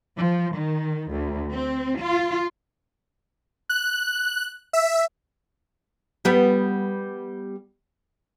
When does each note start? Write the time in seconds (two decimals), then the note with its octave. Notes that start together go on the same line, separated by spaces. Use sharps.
0.17 F3
0.54 D#3
1.12 D2
1.51 C4
1.98 F4
3.69 F#6
4.73 E5
6.25 G3 B3